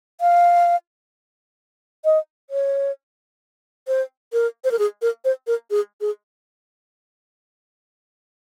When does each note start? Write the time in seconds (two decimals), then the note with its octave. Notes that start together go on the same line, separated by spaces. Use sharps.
0.21 F5
2.05 D#5
2.50 C#5
3.88 C5
4.33 A#4
4.64 C5
4.71 A#4
4.79 G#4
5.02 A#4
5.25 C5
5.47 A#4
5.70 G#4
6.01 G#4